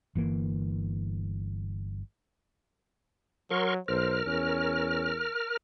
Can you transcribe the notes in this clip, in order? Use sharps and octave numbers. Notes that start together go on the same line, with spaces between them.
G1 E3 A#3
F#3 A#4 C6 C#6
B1 A#4 C5 F6
E2 C#4